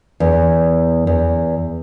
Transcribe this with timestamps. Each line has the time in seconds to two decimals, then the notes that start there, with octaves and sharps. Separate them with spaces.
0.20 E2
1.07 E2